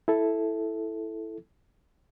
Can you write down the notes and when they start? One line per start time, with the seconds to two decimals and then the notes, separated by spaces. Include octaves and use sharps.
0.08 E4 A4